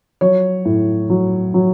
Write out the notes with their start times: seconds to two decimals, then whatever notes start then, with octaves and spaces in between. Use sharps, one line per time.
0.21 F#3 C#5
0.65 A2
1.10 F#3
1.54 F#3